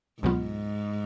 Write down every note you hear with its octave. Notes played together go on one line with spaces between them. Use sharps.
C#2 G#2 B2 F#3 B3 F4